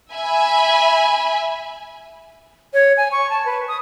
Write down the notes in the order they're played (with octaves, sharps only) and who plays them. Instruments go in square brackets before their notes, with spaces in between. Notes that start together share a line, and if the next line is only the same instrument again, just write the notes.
[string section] E5 G#5 B5
[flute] C#5
G#5
C#6
A5
B4
D#6